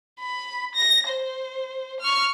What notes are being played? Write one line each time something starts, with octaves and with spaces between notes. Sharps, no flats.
B5
A#6
C5
C#6 F6